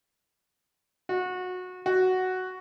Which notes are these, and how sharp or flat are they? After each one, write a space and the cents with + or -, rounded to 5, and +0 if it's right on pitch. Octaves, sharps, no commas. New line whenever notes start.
F#4 -20
F#4 +5